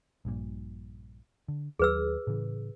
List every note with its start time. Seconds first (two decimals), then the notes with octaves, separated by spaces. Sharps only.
0.25 A#1 G2 A#2
1.48 D3
1.79 D#2 F#3 G#4 B4 E6
2.27 A2 C#3 E3